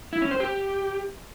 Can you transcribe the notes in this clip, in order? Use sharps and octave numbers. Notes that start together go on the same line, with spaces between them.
E4
C#4
C5
G4